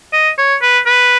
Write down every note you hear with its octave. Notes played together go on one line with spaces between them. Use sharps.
D#5
C#5
B4
B4